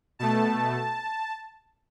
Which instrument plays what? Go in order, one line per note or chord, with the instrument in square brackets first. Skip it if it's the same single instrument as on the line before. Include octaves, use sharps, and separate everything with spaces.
[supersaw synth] B2 A3 A5